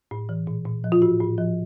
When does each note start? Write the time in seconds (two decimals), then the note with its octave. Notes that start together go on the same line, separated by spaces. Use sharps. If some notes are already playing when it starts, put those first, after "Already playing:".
0.11 A2
0.29 E3
0.47 A#2
0.65 A#2
0.84 F3
0.92 F4
1.02 A2 F#4
1.20 A2
1.38 F3